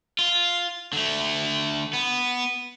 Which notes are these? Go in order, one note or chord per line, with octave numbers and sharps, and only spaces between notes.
F4
D3 A3
B3